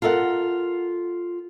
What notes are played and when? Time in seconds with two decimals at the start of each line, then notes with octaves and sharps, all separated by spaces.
0.02 F4 A4 A#4 E5 F#5